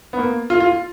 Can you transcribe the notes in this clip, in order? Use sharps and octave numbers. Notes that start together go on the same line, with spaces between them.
B3
A#3
F4
F4